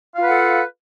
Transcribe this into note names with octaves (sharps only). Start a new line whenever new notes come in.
F4 A4 B4 F5 F#5